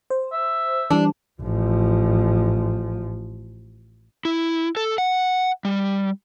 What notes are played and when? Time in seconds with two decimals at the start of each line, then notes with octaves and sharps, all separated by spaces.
0.10 C5
0.32 E5
0.90 E3 G3 D4
1.42 A1 F3
4.25 E4
4.77 A4
4.98 F#5
5.65 G3